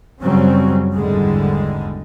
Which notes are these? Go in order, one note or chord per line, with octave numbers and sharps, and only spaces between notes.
F#2 C#3 F#3 G3 C4 C#4
G#1 E2 D3 G3 G#3